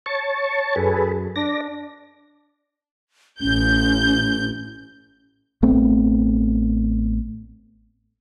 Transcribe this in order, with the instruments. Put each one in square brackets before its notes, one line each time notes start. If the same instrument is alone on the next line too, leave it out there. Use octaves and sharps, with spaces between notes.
[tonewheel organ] C#5 A5 C#6
[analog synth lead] F#2 [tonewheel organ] G#4 A4 B4
[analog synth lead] D4 [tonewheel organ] D5 A#6
[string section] A1 G6 [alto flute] C#4
[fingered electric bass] A1 A3 B3 C4